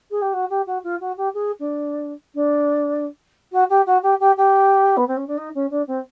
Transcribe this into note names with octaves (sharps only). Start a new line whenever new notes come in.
G#4
G4
F#4
G4
F#4
F4
F#4
G4
G#4
D4
D4
F#4
G4
F#4
G4
G4
G4
B3
C4
C#4
D4
D#4
C#4
D4
C4